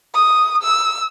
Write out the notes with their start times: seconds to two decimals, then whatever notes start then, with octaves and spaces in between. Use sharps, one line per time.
0.14 D#6
0.63 E6